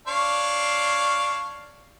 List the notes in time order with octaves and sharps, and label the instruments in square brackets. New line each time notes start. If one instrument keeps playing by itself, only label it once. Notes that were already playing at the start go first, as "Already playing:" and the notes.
[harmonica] D4 C#5 F5